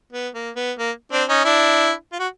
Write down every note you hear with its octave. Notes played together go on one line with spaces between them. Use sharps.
B3
A#3
B3
A#3
C4 D4
C#4 D#4
D4 E4
F4
F#4